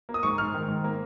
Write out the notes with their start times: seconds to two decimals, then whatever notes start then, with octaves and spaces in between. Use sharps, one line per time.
0.09 A#3
0.14 D#6
0.23 G#2 C#6
0.38 G#2 F6
0.54 D#3
0.68 G#2
0.84 A#3